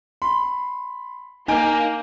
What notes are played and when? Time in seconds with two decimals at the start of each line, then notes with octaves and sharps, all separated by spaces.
0.22 B5 C6
1.48 A#3 D#4 G#5 G6 D7